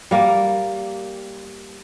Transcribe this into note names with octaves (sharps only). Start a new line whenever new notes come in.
G3 A#3